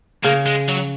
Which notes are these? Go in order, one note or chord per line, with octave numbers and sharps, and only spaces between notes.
C#3 A#3
G#3
F#3